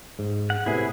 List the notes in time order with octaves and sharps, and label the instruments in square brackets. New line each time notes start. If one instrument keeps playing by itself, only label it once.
[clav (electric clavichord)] G#2
[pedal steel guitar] F#5
[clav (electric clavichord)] A2 C3 B3 [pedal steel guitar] E4 G#4